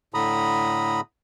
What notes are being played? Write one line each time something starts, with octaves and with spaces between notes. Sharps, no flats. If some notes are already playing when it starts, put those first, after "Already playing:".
A2 D3 A#5 B5 D#6